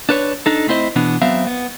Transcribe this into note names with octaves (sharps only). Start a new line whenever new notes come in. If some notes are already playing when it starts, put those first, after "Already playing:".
D4 B4 C#5
D4 D#4 A4
A3 C4 E4 C5 D#5
B2 E3 B3 D4
F#3 B3 C4 E5 F5
B3